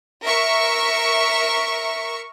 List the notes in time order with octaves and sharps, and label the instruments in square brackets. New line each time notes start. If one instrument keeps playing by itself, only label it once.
[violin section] A#4 E5 C#6